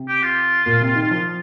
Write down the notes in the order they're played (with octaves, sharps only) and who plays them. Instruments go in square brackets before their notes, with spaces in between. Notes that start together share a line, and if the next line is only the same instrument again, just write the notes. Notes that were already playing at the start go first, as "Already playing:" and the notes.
Already playing: [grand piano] C3
[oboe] G4
F4
[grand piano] A#2
C3
D#3
[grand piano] F3 [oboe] F4